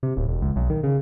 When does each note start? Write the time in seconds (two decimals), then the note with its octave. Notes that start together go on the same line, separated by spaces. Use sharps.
0.03 C3
0.17 D1
0.28 E1
0.42 C#2
0.56 B1
0.70 D#3
0.83 C#3